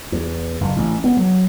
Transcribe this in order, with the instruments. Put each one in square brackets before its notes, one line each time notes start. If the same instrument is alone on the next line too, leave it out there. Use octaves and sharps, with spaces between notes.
[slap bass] E2
F#1
A1
B3
F#3